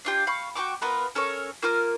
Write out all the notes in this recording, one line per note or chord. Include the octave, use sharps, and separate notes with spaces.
D4 F4 G4
F5 B5 C#6
F#4 G5 C#6 D6
B3 F4 A#4 B4
C#4 A4 A#4 C#5
A#3 F4 A#4 F6